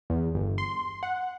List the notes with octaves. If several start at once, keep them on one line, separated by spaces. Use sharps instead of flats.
E2
G1
C6
F#5